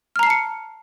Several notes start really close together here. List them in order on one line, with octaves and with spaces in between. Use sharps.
F6 A#5 C7 A5 C#7